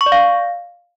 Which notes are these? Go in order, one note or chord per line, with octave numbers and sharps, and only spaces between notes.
C#6
D5
F5